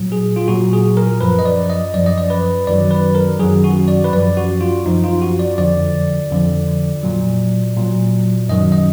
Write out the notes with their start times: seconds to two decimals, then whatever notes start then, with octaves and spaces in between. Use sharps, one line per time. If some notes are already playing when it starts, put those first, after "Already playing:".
Already playing: A#2 F#3
0.12 G#4
0.36 F4
0.48 A#2 F#3 F#4
0.73 G#4
0.97 A#4
1.21 F#2 F3 B4
1.39 D#5
1.45 D5
1.70 D#5
1.94 F#2 F3 D5
2.06 D#5
2.18 D5
2.30 B4
2.67 F#2 D#3 F#3 D5
2.91 B4
3.15 A#4
3.40 F#2 D#3 F#3 G#4
3.64 F#4
3.88 D5
4.04 B4
4.13 F#2 F3 D5
4.37 F#4
4.61 F4
4.86 F#2 F3 D#4
5.04 F4
5.22 F#4
5.39 D5
5.58 F2 D3 F3 D5
6.31 F2 D3 F3
7.03 A#2 F#3
7.76 A#2 F#3
8.49 F#2 D#3 F#3 D#5
8.72 D#5